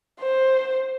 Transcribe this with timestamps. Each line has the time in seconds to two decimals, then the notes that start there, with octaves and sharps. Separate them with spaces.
0.21 C5